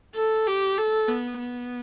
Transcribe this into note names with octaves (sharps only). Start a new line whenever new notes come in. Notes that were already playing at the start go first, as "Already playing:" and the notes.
A4
G4
A4
B3
B3